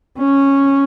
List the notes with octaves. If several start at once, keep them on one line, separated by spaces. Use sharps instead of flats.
C#4